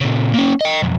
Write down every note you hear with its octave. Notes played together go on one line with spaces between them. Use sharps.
A#2 C#3
A#3 C#4
D#5 G5
B1 F2